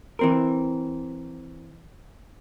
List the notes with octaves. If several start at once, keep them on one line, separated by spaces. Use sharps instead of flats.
E3 C4 A#4